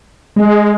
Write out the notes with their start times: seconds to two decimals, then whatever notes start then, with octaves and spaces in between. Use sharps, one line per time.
0.36 G#3